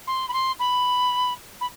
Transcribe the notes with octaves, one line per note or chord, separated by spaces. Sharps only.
C6
B5
C6
B5
B5